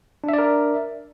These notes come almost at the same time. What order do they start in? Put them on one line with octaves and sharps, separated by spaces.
D4 E5 D5 A#4